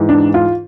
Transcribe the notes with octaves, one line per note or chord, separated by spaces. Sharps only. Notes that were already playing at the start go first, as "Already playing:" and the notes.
Already playing: G#2 E3
D4
F4